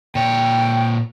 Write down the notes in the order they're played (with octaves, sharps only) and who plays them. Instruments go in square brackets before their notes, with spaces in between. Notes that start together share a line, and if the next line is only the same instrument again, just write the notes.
[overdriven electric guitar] A#2 C#5 [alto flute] G5